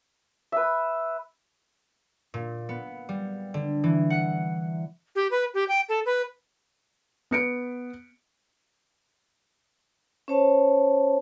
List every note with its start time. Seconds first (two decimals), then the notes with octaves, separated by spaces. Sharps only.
0.52 B4 E5
2.34 A#2
2.69 B3
3.09 G3
3.54 D3
3.84 E3
4.10 F#5
5.15 G4
5.31 B4
5.54 G4
5.68 G5
5.89 A4
6.06 B4
7.31 B3 C#7 D7
10.28 C#4 C5 C#5 A5